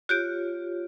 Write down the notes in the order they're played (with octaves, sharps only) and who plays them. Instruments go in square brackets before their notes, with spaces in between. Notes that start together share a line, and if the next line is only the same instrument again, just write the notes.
[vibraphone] F4 G4 C#5 [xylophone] F#6 G6 D7